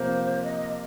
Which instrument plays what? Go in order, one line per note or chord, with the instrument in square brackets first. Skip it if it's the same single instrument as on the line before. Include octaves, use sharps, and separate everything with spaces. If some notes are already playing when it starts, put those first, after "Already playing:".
Already playing: [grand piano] C3 F3 A#3 [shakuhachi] C5
[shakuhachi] D#5